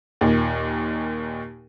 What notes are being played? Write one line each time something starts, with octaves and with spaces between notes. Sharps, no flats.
D#2 A#2